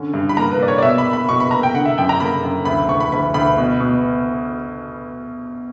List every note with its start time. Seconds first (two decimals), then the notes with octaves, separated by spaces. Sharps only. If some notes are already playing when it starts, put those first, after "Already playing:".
Already playing: D3 C#4
0.14 G2
0.29 B5
0.37 A#3 A#5
0.52 B4
0.59 A#3 D5
0.68 C#5
0.78 D5
0.82 B2 E5
0.98 B5
1.05 A#3
1.13 B5
1.29 B2 C#6
1.40 B5
1.51 A#3 A#5
1.63 G5
1.74 D3 F#5
1.85 E5
1.97 F#2 G5
2.09 A#5
2.20 A#3 B5
2.43 F#2
2.65 D2 B5
2.88 D2 C#6
3.00 B5
3.12 D2 B5
3.34 D2 B5
3.58 B2
3.80 B2